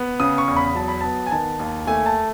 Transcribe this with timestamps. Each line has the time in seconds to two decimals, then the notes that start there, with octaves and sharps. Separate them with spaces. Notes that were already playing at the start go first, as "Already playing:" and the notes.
Already playing: B3
0.20 C#3 D#6
0.38 C#6
0.48 E2
0.56 B5
0.75 F#3 A5
0.88 B5
1.01 B3 A5
1.26 G#5
1.31 D#3 A5
1.60 D#2
1.87 A3 G#5
2.06 A5